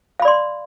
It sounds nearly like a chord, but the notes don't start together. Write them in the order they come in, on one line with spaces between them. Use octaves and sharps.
F5 B5 D5 C6